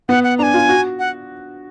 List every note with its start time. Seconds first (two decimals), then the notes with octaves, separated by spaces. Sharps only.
0.09 B3 F#5
0.24 F#5
0.38 D4 G#5 A#5
0.54 F4
0.69 F#4
0.99 F#5